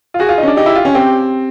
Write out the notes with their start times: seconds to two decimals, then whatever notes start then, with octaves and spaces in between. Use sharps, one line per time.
0.14 F4
0.19 F#4 G#4
0.29 F4
0.38 D#4
0.43 C#4
0.47 D4
0.57 D#4 G4
0.66 E4
0.75 F4
0.85 C#4
0.95 C4 G4